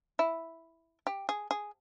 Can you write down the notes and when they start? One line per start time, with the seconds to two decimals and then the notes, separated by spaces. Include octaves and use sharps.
0.19 E4
1.07 G4
1.29 G#4
1.51 G#4